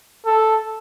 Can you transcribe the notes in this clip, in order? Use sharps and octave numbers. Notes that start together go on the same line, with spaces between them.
A4